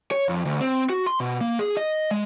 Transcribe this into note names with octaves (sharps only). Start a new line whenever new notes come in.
C#5
F2
D2
C4
F#4
C6
B2
A#3
G#4
D#5
G#3